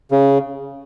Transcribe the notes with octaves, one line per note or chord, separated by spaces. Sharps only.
C#3